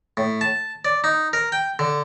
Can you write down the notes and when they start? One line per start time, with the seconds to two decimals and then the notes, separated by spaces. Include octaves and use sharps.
0.17 A2
0.41 A5
0.85 D5
1.04 D#4
1.33 A#4
1.52 G5
1.79 D3